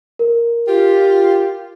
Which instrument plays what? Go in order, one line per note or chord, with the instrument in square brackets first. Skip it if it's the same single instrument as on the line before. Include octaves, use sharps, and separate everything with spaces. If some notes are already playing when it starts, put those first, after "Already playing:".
[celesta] A#4
[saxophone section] F4 G4